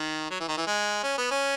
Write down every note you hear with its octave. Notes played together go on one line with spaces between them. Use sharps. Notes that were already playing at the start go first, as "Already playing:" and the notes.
Already playing: D#3
F#3
E3
D#3
E3
G#3
C#4
B3
C#4